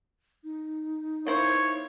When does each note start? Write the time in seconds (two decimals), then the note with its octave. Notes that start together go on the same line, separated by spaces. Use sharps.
0.44 D#4
1.27 A#3 E4 C5 C#5